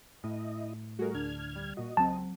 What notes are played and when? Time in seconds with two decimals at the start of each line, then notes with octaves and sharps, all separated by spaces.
0.24 A2 E4 D#5
0.99 G3 A3 F#4 G#4 A#4
1.15 D2 D4 F6 G#6
1.55 G3
1.77 A#2 F#4 D#5
1.97 C#2 F#3 C4 A5